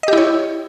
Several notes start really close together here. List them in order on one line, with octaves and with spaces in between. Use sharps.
D#5 G4 E4 C#5